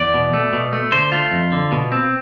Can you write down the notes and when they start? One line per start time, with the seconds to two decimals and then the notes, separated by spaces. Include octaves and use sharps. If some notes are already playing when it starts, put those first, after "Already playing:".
Already playing: E2 D5
0.14 B2
0.33 A3
0.53 B2
0.73 A3
0.92 D3 C5
1.12 A3 F4
1.32 F2
1.52 D3
1.72 B2
1.92 C4